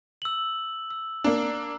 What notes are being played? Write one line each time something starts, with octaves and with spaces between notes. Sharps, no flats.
E6 F#7
E6
A#3 D4 A#5